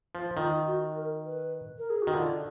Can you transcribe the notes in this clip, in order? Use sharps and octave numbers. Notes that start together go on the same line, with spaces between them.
F3
D#3 F4
F#4
A#4
B4
A#4
G#4
F#4
D#3
D3 F4